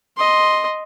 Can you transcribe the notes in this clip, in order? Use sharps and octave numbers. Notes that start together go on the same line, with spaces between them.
D#5 C6